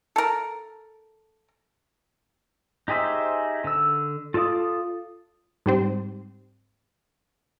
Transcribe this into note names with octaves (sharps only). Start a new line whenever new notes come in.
A4 A#4
D#4 G4 G#4 C5 E5
D3 E6
F4 A4 D5 F5 D#6
G#2 G3 C4